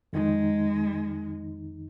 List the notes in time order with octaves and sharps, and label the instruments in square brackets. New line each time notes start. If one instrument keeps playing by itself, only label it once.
[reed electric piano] F2 D#3 D#4 [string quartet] G#3